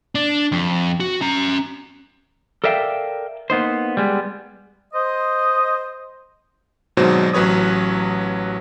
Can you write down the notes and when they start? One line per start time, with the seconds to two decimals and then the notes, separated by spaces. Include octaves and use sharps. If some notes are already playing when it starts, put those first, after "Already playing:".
0.15 D4
0.52 F2
1.00 F#4
1.21 C#4 A#5
2.64 A4 A#4 D5 E5 F5 G5
3.50 A#3 B3 D#4 C5
3.97 G3 G#3 B3
4.93 C5 D#5
6.97 G#1 G#2 B2 F#3 C5
7.34 A1 F#3 B4 C#5 D#6